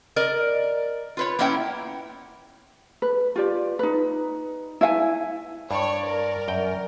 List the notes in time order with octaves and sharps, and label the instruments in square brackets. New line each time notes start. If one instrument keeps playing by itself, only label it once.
[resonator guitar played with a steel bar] A#4 D5 D#5
F4 B4 C#5
A#3 B3 C#4 E4 C#5 G5
[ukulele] B4
F4 G4 D5
D#4 B4
E4 E5 F5 G#5
[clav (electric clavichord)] G2 [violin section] C#5 [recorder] D5
[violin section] A#4
[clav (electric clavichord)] F#2 G5